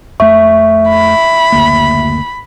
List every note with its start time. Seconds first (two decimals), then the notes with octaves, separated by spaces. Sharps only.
0.20 F2 A3 E5 C#6
0.89 B5
1.52 F#1 D2 A#3